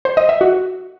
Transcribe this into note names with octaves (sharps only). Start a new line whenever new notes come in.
C5
D#5
E5
F#4